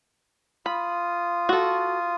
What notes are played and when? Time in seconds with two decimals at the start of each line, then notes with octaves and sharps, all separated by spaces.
0.66 F4 B5 D#6
1.49 F#4 A4